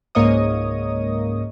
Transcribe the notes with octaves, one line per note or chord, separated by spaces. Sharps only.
C#2 G#2 A#3 C#5 D#5 D#6